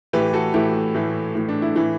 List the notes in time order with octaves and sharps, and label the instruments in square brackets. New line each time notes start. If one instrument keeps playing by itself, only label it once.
[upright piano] A2 E3 G4 B4
F#4 A4
A2 E3 E4 G4
A2 E3
A2 E3
D4
E4
A2 E3 E4